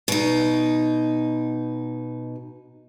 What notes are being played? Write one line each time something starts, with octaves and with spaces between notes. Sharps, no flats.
B2 D#4